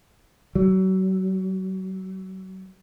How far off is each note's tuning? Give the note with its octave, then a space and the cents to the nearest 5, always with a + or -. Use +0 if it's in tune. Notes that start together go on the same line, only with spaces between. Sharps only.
F#3 +35